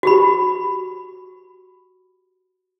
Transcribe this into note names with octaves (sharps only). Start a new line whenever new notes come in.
F#4 G4 B5